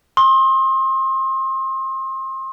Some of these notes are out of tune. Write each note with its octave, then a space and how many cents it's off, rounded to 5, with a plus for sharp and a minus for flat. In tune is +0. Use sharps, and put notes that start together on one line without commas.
C6 +30 D#6 +25